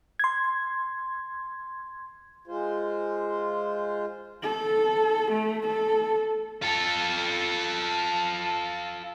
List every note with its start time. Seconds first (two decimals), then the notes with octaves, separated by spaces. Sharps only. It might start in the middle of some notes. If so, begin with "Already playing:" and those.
0.19 C6 G#6
2.47 G#3 F4 C5
4.43 A4
5.32 A3
5.67 A4
6.62 F4 A4